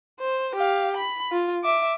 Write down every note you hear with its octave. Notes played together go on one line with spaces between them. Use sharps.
C5
G4 F5
B5
F4
E5 D6